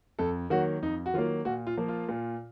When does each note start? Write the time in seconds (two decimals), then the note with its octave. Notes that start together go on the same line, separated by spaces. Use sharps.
0.19 F2 A4
0.50 D#3 F#3 A#3 F#4
0.82 F2 D#4
1.06 F#4
1.14 D#3 F#3 A#3 F4
1.45 A#2 F#4
1.67 F4
1.77 F3 A#3
1.88 F4
2.09 A#2